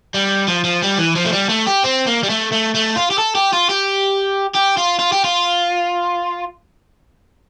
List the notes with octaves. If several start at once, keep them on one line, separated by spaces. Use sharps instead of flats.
G3
F3
F3
G3
E3
F3
A3
G3
A3
G4
C4
A#3
G3
A3
A3
A3
F4
G4
A4
G4
F4
G4
G4
F4
F4
G4
F4